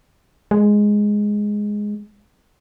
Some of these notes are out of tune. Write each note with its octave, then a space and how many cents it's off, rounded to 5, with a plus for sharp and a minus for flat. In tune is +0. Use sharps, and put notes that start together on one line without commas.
G#3 +0